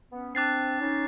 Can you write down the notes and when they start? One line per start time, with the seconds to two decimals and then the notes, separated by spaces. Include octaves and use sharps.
0.12 B3 C#4
0.35 C4 D4 D6 F#6 A6 C7
0.80 C#4 D#4